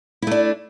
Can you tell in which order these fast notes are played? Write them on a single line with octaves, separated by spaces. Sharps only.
E4 A3 D4